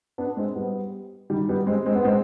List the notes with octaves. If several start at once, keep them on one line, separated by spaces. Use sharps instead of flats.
B3 D4
G#3 C4
G3 B3
D#3 G3
G3 B3
G#3 C4
G#3 C4
B3
G#3 C4